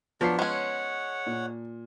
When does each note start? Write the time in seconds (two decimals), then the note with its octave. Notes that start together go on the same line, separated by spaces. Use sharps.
0.21 F3 F#3 B3 D4 C#5 B6 C7
0.39 G#3 C#4 C#5 F#5
1.27 A#2